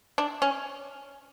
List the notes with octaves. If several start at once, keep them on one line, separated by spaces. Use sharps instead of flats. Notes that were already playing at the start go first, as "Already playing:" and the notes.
D4
C#4